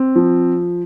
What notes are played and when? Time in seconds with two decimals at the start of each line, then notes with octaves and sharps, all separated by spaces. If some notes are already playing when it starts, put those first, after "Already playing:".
Already playing: C4
0.16 F3